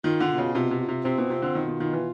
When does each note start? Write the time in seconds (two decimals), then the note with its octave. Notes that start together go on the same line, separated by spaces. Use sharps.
0.04 D#3 F4
0.20 D3
0.29 B2
0.38 C#3
0.54 C3 F4
0.71 C3
0.80 F4
0.89 C3
1.05 C3 C4
1.18 B2
1.30 C3 F4
1.42 D3
1.55 B2 D#3
1.68 D#3
1.80 D#3 F4
1.93 E3